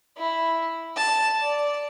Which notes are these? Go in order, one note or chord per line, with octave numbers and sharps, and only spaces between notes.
E4
A5
D5